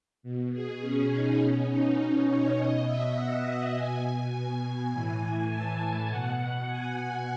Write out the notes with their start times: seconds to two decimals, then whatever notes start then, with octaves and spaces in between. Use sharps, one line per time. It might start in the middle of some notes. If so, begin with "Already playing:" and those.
0.23 B2
0.52 G#4
0.81 C#4
1.11 D#4
1.40 B2 C#4
1.69 D#4
2.27 C#5
2.57 B2 D#5
2.86 E5
3.15 F#5
3.74 B2 G#5
4.03 G#5
4.32 G#5
4.91 A2 E3
5.49 A5
5.79 G#5
6.08 B2 F#5
6.67 G#5
6.96 F#5